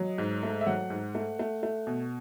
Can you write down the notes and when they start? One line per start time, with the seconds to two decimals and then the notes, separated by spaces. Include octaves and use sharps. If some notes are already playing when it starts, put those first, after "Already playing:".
Already playing: F#3 D#5
0.18 G#2
0.43 A3
0.61 E5
0.66 F#3 F#5
0.90 G#2
1.15 A3
1.39 A3
1.63 A3
1.87 B2